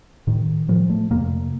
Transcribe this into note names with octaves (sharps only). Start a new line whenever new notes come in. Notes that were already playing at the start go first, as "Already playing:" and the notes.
A2 D#3
A2 F3
A3
F2 C3 A#3